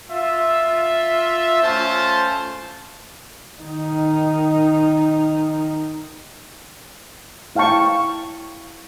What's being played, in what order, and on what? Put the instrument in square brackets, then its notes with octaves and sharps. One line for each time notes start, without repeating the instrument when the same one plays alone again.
[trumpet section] F4 E5
A3 C#4 F4 C5 A5
[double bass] D#3 D#4
[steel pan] E4 F5 G5 A5 C#6